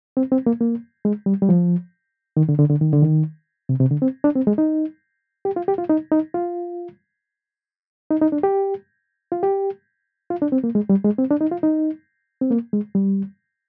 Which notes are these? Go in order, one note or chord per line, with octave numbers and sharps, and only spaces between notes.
C4
C4
A#3
A#3
G#3
G3
G3
F3
D#3
D3
D3
D3
D#3
D3
D#3
C3
C3
D3
C4
D4
C4
G#3
D#4
G4
F4
G4
F4
D#4
D#4
F4
D#4
D#4
D4
G4
F4
G4
F4
D4
C4
A#3
G#3
G3
G#3
C4
D4
D#4
F4
D#4
C4
A#3
G#3
G3